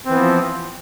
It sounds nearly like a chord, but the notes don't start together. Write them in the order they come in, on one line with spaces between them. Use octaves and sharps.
C4 E3 B3 F3